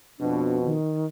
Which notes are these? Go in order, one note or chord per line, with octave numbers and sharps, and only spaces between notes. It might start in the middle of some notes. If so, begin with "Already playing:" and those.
F2 B2 D4
D#3